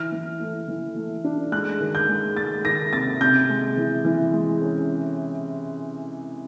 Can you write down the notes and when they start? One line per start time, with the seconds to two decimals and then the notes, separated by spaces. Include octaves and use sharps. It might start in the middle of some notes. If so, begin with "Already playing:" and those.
Already playing: E3 F6
0.12 E3
0.40 A3
0.68 E3
0.96 A3
1.24 D4
1.52 G#3 F#6
1.80 D#3
1.95 G6
2.09 G#3
2.37 G#3 A6
2.64 D#3 A#6
2.93 C3 A6
3.21 C3 G6
3.49 G#3
3.77 E3
4.05 E3
4.33 G#3
4.62 C#4